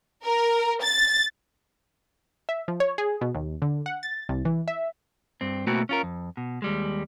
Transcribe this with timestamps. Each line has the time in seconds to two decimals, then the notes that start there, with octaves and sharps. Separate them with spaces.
0.24 A#4
0.82 A6
2.49 E5
2.68 F3
2.80 C#5
2.98 G#4
3.21 B2
3.35 D#2
3.62 D3
3.86 F#5
4.03 A6
4.29 C2
4.45 E3
4.68 E5
5.41 G2 C4
5.67 B2 A3 A#3 C4 E4 F#4
5.89 C#4 F4 A#4
6.03 F2
6.37 B2
6.62 D#2 G3 G#3